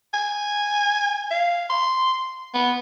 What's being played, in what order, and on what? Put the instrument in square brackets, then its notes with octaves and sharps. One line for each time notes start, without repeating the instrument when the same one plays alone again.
[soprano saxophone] G#5
F5
C6
B3